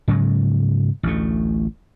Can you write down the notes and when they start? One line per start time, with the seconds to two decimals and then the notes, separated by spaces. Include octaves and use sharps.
0.08 G#2 C#3 F#3
1.03 A1 D2 A3